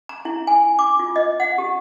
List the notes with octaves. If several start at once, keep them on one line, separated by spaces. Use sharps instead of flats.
A#5
E4
G#5
D6
F4
D#5
F#5
G4